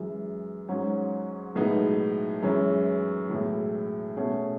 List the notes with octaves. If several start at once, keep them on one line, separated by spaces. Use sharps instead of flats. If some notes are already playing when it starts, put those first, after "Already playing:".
Already playing: F#2 E3 G#3
G#2 F#3 C#4
B1 A2 G#3 B3 D#4
F#2 E3 G#3 C#4
B1 A2 E3 G#3
B2 A3 C#4 G#4